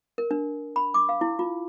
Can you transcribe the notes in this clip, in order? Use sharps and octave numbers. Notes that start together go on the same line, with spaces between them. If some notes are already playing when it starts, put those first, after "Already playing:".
A#4
D4
B5
D6
F5
E4
F4